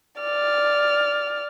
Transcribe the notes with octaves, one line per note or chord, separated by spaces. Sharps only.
D5 F6